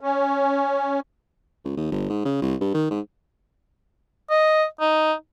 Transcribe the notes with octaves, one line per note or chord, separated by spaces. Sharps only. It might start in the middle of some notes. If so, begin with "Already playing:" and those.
C#4
C#2
D#2
G1
G#2
C#3
C2
G2
D#3
G#2
D#5
D#4